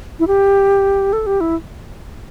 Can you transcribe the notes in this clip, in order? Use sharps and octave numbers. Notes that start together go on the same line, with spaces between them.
E4
G4
A4
G4
E4